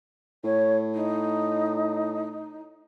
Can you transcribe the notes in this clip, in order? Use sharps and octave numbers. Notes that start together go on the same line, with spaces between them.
A2 C#5
D#4